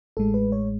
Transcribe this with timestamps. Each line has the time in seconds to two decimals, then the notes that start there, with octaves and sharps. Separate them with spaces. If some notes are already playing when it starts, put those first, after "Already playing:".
0.17 A1 A2 G#3 A4
0.34 B4
0.52 C#5